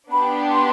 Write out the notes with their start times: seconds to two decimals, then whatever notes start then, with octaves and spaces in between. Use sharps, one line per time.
0.10 B3 D4 G4 B5
0.50 C6